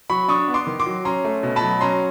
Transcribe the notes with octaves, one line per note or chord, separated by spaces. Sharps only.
F#3 B5 C#6
D4 C#6 D#6
B3
C6 D6
D#3
C6 D6
F#3
C#4 A#5 C6
A3
B2
A5 B5
F#3
C#4 A#5 C6